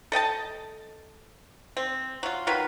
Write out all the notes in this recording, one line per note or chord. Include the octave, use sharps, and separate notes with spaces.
A4 D#5 G5 A5
C4
F#3 F4
D#3 F#3 F4 B4